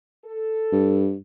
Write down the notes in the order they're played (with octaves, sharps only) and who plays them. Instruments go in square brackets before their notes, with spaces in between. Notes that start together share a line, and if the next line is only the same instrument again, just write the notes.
[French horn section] A4
[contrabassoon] G2